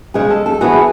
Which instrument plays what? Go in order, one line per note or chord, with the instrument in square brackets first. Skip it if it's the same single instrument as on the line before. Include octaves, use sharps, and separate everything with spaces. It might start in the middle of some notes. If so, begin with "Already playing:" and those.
[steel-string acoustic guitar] C#3 G#3 C#4 [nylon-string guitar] G#4
[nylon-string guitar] A4
A4
[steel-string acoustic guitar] E3 B3 F#4 [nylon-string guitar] G#4